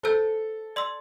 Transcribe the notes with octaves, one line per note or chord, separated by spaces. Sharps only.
A4 C5 A5 E6 G6
D5 C6 E6